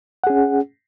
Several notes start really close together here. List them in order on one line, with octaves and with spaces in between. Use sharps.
F#5 G#4 C#4